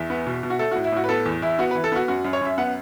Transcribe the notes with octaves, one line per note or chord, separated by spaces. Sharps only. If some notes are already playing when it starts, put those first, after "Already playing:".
Already playing: E2 E5
B3
B2
B2
F#4
A3 A4
A2 F#4
E4
A2 F#4
B4
B3 A4
E2
E2 E4
B3 F#4
E3 B4
A4
B3 F#4
F#2 F#4
F#2
C#5
F#2 E5
B3 F#5